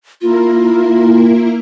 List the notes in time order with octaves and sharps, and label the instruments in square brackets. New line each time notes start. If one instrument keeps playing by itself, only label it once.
[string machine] A#3 E4 A#4 [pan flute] F4